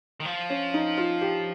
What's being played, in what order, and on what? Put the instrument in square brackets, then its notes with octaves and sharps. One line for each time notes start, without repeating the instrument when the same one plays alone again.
[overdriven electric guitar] D#3
F3
[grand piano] C#4
D#4
F4
G4